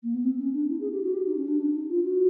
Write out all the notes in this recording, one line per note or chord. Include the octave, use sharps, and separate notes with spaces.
A#3
B3
C4
C#4
D4
E4
G#4
G4
F#4
G4
D#4
C#4
D4
D4
D#4
F4
F#4